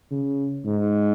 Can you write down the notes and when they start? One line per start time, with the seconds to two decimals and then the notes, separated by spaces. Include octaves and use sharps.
0.11 C#3
0.66 G#2